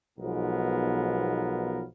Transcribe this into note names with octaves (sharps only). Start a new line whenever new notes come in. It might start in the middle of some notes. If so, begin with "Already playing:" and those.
B1 G#2 F3 B3 A#4